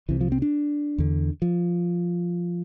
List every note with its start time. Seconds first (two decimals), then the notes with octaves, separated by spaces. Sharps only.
0.08 C2 C3 E3
0.21 F3
0.32 C4
0.42 D4
0.98 E2 D3
1.42 F3